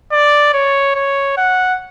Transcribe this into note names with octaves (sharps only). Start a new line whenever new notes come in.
D5
C#5
C#5
F#5